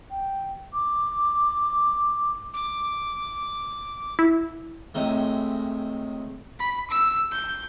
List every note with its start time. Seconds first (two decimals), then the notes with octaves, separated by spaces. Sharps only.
0.11 G5
0.74 D6
2.54 D6
4.19 E4
4.95 A2 C3 D#3 G#3
6.59 B5
6.90 E6
7.32 G6